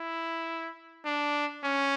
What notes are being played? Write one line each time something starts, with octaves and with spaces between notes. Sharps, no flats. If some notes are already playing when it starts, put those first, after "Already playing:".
Already playing: E4
D4
C#4